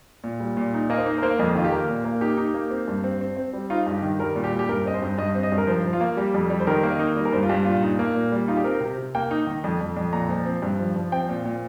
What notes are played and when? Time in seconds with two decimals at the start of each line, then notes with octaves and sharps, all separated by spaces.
0.24 A#2
0.40 G3
0.57 A#2
0.74 D#4
0.90 A#3 D#5
0.97 C5
1.06 D#4
1.18 A#4
1.23 A#3 C5
1.39 F2 D#5
1.55 D#3 F4
1.64 G4
1.72 A#3 A#4
1.89 A#2
2.04 A#3
2.21 D#4 G4
2.37 D#4
2.54 A#3
2.70 C4
2.88 G2
3.04 C4
3.21 C4
3.37 C4
3.53 G3
3.70 D#4 F4
3.87 G2
3.94 G4
4.02 D#3
4.19 G3 A#4
4.36 A#2
4.44 G4
4.52 G3
4.59 G4
4.68 G2 A#4
4.85 C4 D#5
4.94 C5
5.02 G2
5.18 G2 D#5
5.35 C4
5.43 D#5
5.52 G2
5.58 A#4
5.67 F3 C5
5.84 F3
5.93 F4
6.00 A#3
6.17 G3 G4
6.34 F2
6.50 G3
6.60 C5
6.67 D#3 A#4
6.83 A#3
6.92 D#5
7.00 D#4
7.16 G3
7.25 A#4
7.32 G2 C5
7.43 F4
7.49 G2 G4
7.65 A#2 F4
7.82 D#4
7.99 A#3
8.15 A#2
8.32 G3
8.48 D#4 F4
8.57 G4
8.64 C4 A#4
8.81 C3
8.98 C3
9.15 A#3 G5
9.31 D#4
9.47 D#3
9.64 F2
9.80 F2
9.97 F2
10.13 A#2 A#5
10.29 F3
10.46 C4
10.62 G2
10.79 F3
10.96 F3
11.12 C4 G5
11.29 A#2
11.45 A#2